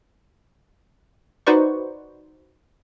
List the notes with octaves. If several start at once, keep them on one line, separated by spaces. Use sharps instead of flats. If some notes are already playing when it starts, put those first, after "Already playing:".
D#4 F#4 B4 C5 D5 C#6